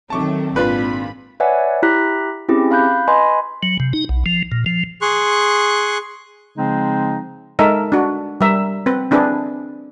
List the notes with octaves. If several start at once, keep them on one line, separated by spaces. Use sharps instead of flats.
D#3 F#3 A3 C4 A5 C#6 D6
G#1 A#2 D4 F4 B4 B5
B4 C#5 D5 E5 F#5 G#5
E4 G4 A#5 F#6 B6
C4 C#4 E4 G4 G#4
F5 B5 F#6 G6
B4 D#5 G#5 B5 C6
F#3
C3
D#4
B1
F3
A#2
F3
G#4 C6 C#6 F#6
C#3 F3 G#3 C4 D#4
G#3 D#4 A4 A#4 D#5 E5
D4 F#4
G3 A#4 E5 A#5
C4 B4
C4 D4 E4 G#4 B4